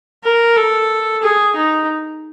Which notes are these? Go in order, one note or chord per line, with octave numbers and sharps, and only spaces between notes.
A#4
A4
G#4
D#4